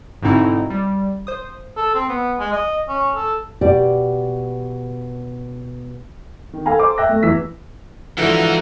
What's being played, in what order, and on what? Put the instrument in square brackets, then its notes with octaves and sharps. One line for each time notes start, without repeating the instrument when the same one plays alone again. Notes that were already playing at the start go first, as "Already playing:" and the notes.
[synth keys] G#2 B2 D3 C4 D#4 E4
G3
C5 D#6
[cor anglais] A4
C4
B3
G#3
D#5
C#4
A4
[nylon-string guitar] B2 G4 D5
[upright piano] D#3
A4 F5 G#5 A#5 B5
A4 C5 D6
E5 G5 E6 F#6 A#6
A3
E2 E3 E6 B6
[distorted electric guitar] G#2 D#4 [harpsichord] D3 E3 [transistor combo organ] F3 E4 F#4